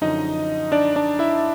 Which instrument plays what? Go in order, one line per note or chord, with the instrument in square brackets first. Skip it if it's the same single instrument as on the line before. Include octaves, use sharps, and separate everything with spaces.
[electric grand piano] F#2 D3 F3 D#4 D#5
D4 D5
D4 D5
E4 E5